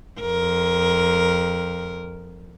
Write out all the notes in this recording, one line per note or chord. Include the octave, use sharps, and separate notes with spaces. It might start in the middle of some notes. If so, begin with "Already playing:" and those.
F2 A#4